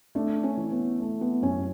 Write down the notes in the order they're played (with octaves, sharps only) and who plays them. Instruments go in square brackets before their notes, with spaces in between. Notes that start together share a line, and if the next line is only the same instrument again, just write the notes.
[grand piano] A3 [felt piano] D4
[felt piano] C#4
[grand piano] E3
[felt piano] B3
[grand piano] A3
[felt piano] B3
[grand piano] F#2 [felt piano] C#4